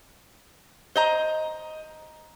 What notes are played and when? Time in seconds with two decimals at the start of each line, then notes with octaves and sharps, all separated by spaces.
0.96 C5 D#5 A#5